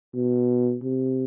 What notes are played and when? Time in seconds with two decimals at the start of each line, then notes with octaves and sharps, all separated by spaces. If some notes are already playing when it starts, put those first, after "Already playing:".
0.14 B2
0.84 C3